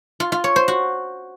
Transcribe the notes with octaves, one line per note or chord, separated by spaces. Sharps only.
F4
F4
C#5
C5
F#4